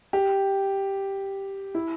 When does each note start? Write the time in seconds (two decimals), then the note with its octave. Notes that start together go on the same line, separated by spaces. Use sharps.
0.13 G4
1.75 E4